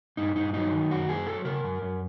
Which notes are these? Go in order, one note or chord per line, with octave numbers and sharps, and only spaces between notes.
G2 D#4
G2 D#4
F#3 D#4
D#3
F#2 F#4
F#2 G#4
F#3 A4
C#3 A#4
F#2
F#2